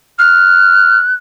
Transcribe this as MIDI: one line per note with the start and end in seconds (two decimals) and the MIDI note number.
0.19 0.99 89
0.19 1.14 90